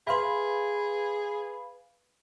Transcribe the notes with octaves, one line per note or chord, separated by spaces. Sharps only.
G#4 B4 E5 F5 B5 C6